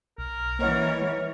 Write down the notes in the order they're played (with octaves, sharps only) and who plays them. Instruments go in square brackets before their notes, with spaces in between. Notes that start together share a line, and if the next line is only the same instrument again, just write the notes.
[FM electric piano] B1 [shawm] A#4
[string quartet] E3 C#5 [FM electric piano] A#3 D#5 F#5
[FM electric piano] G#3